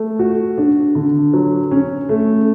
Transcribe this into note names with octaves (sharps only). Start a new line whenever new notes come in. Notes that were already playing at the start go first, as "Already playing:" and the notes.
Already playing: A3
F#4
D4
D3
F#3
C#4
A3